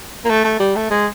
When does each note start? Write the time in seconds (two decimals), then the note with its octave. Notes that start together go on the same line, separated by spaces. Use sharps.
0.25 A#3
0.30 A3
0.45 A3
0.60 G3
0.76 A3
0.91 G#3